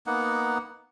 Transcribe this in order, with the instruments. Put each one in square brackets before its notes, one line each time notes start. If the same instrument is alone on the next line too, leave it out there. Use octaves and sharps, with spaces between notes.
[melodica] A#3 B3 D#4 F#5